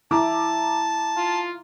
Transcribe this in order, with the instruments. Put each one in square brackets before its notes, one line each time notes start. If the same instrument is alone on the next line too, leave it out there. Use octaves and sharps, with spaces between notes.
[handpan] E4 [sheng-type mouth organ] A5 [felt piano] A#5 D6
[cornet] F4